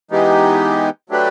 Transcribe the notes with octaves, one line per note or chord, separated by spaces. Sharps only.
E3 G#3 B3 D#4 G4
F#3 A3 D4 G4 B4